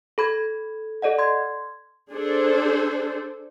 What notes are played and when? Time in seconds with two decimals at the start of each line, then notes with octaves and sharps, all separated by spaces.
0.18 A4 B5 G#6
1.02 A4 D5 D#5 F#5
1.19 C6 G#6
2.12 D4 G#4 A4 C5